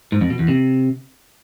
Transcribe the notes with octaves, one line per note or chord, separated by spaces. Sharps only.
G#2
F2
B2
E2
C3